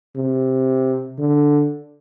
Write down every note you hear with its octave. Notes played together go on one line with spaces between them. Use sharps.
C3
D3